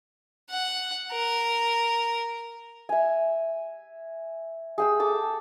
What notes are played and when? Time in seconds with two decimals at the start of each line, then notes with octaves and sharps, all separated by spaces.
0.50 F#5
1.12 A#4
2.89 E5 G#5
4.78 G#4 G5 E6
5.00 A4 D6